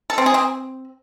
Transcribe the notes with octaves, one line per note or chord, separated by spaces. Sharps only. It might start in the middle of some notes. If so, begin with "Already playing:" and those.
A4
C4
G#4
C4